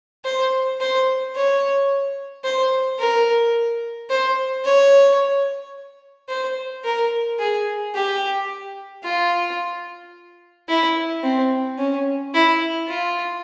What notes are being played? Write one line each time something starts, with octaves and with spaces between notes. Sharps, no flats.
C5
C5
C#5
C5
A#4
C5
C#5
C5
A#4
G#4
G4
F4
E4
C4
C#4
E4
F4